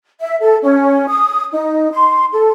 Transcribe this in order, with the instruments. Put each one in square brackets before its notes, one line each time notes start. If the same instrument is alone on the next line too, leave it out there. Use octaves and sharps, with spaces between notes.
[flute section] E5
A4
C#4
D#6
D#4
C6
A4